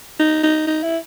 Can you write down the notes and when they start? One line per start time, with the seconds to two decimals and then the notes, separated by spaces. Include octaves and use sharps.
0.20 D#4
0.43 D#4
0.67 D#4
0.83 E4